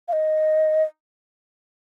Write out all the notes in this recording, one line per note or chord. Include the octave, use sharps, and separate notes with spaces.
F5
D#5